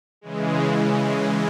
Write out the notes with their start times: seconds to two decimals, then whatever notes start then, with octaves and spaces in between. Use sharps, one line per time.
0.21 C#3 E3 G#3